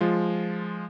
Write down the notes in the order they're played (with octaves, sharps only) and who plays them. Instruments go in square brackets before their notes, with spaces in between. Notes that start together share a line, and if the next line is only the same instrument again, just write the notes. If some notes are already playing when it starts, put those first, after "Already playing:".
[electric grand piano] F3 G#3 F4